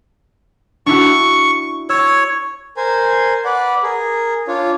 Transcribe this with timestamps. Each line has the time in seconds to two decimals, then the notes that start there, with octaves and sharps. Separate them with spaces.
0.86 D4 E4 F#4 C#6
1.89 C#5 E6 G#6
2.77 A#4 C5 G#5
3.45 B4 D5 F#5
3.83 G#4 A#4
4.48 D4 F4 C#5